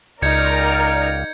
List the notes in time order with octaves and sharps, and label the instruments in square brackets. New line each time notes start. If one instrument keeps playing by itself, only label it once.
[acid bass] C#2 [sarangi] D#4 [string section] A#4 D5 F6 [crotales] G6 G#6 C#7